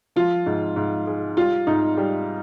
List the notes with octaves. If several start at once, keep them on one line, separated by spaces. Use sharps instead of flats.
F3 F4
G#2
G#2
G#3
G3 F4
G#2 D#4
G3